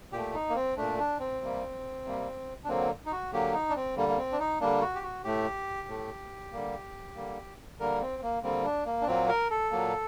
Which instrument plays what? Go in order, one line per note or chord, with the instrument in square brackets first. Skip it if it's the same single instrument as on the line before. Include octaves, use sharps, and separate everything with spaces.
[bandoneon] A#2 G4
A3
D#4
A#3
C4
A#2 A3 D4
D4
C4
C3 G3 A#3
C3 G3 A#3
D4
D3 F#3 A#3 C4
D#4
F#4
D3 F#3 A#3 G4
D#4
D4
C4
D3 G3 A#3
A#3
C4
D4
D#4
D3 G3 A#3 D4
F#4
G4
F#4
A2 A3 G4
A2 A3
D3 G3 A#3
D3 G3 A#3
D3 G3 A#3 A#4
C4
A#3
D3 G3 A#3 C4
D4
A#3
D4
A#2 F#3 A#3 C4
A#4
A4
A#2 F#3 A#3